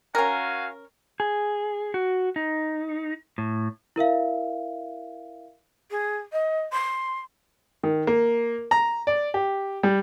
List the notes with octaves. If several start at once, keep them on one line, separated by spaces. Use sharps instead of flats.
C#4 F#4 A#4 F5 G#5
G#4
F#4
D#4
A2
E4 A#4 E5 F5
G#4
D#5
C6
D#3
A#3
A#5
D5
G4
G3